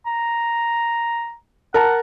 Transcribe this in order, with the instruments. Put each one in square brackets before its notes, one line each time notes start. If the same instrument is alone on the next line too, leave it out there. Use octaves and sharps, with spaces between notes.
[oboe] A#5
[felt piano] A#4 A5 A#5 [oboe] F#5